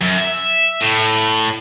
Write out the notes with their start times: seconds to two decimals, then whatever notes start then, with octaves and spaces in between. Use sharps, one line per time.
0.01 F#2
0.18 E5
0.82 A2